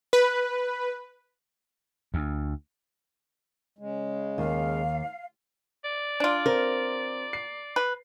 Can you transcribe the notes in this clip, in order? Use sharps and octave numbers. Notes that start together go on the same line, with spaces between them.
B4
D2
C#3 G#3
D#2 F5
D5
D4 F4
C4 A#4
C7
B4